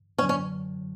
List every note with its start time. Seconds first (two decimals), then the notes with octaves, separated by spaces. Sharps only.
0.18 F#2 D3 F#3 C#4
0.29 C#4